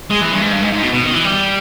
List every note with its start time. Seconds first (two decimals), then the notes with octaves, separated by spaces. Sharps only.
0.10 G#3
0.21 E3
0.32 G2
0.41 G#2
0.52 G2
0.62 G#2
0.73 G#2
0.82 B2
0.93 B2
1.03 D#3
1.13 E3
1.24 G3